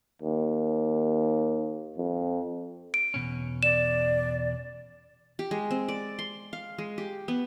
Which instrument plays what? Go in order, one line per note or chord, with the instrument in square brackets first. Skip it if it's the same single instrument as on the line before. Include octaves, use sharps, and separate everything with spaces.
[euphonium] D#2
F2
[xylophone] D7
[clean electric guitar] E2 B2 C#4
[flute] D5 [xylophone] E7
[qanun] G4
G#3
C4
D5
C6
F5
G#3
G4
B3